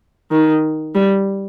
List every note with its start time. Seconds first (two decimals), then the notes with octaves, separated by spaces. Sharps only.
0.31 D#3
0.95 G3